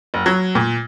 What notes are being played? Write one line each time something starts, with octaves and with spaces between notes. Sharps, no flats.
F#1
F#3
A#2